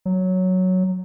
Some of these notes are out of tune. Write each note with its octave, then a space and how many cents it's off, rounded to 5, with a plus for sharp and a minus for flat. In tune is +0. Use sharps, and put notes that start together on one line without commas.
F#3 +0